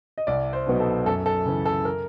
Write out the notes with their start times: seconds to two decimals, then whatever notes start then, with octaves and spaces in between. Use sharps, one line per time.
0.18 D#5
0.27 C2 D5
0.53 C5
0.67 B2 F#3 B3 D#4
0.80 A4
1.06 F#2 A4
1.26 A4
1.46 C#3 E3
1.65 A4
1.85 A#4